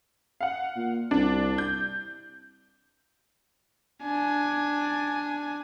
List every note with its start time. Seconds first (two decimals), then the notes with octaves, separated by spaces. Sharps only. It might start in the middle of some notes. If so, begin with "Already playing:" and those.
0.41 F5 F#5
0.76 A#2
1.11 C2 D4
1.58 G6
4.03 D4 G#5